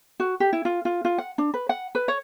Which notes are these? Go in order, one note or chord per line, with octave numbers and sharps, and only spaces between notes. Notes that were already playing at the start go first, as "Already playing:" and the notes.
F#4
G4
E4
F4
F4
F4
F#5
D4
B4
F#5
B4
C#5